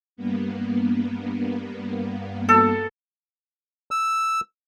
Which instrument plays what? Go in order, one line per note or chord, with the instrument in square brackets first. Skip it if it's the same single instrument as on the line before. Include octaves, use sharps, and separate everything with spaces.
[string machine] G2 A#3 B3
[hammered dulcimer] A4
[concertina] E6